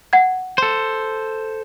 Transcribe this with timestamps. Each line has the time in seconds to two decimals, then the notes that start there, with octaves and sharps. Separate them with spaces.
0.13 F#5 G#6
0.58 A4 C5